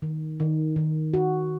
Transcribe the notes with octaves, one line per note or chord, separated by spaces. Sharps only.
D#3
D#3
D#3
F#4